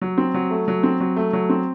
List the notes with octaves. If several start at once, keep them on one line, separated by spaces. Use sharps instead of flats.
F#3
C4
F#3
A3
F#3
C4
F#3
A3
F#3
C4